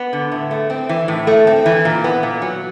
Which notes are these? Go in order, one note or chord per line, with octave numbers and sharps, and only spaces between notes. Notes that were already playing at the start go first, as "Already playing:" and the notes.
Already playing: B3
D3
A2
A3
C4
E3
A2
A3
C4
E3
A#2
B3
A#2
F#3